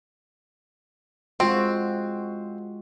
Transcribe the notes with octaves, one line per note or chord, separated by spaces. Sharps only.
G#3 C4 F4 F#4